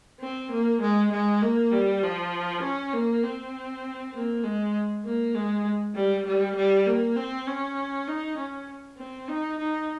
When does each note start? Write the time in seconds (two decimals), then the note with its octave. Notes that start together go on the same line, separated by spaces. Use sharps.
0.21 C4
0.52 A#3
0.81 G#3
1.12 G#3
1.42 A#3
1.72 G3
2.03 F3
2.63 C#4
2.93 A#3
3.24 C4
4.14 A#3
4.44 G#3
5.05 A#3
5.35 G#3
5.95 G3
6.26 G3
6.56 G3
6.87 A#3
7.16 C4
7.47 C#4
8.07 D#4
8.37 C#4
8.98 C4
9.28 D#4
9.59 D#4